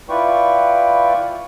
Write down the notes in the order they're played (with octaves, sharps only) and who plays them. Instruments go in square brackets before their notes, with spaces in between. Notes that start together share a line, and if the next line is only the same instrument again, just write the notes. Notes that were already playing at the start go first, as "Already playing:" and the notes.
[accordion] E4 F4 B4 D5 G5 C#6